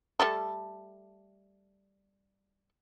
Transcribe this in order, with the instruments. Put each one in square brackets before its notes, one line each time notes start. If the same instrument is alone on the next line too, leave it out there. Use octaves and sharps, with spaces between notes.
[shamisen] G3 A3 A4